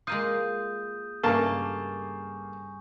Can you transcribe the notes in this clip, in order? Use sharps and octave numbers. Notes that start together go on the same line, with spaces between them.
G#3 A#3 F4 D#6 G6 D#7
G2 C#3 A3 A#3 F5 G#5 A5 C#6